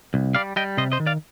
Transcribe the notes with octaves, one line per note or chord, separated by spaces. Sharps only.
C2
G3 D5 F5
G3 D#5 G5
C3 C5 D#5
C5 D#5
D#3
D5 F5